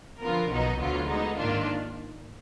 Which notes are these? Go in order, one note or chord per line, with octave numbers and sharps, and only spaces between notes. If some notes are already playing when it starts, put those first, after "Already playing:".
D3 F3 B3 F4 A#4
B1 B2 F#3 B3 D#4
D2 D3 F#3 B3 F4
D3 G#3 B3 D#4
G#2 D#3 A#3 D4 F4